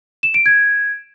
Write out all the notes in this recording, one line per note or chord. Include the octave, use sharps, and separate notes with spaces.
E7
D7
G#6